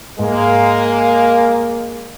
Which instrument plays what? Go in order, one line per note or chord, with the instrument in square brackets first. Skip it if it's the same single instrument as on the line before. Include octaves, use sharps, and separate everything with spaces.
[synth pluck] G#2 [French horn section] G#3 A#3